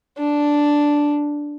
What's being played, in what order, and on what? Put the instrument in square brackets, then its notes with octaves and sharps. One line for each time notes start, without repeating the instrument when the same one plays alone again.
[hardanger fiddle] D4